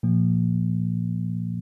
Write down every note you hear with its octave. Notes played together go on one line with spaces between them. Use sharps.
A#2 F3 A#3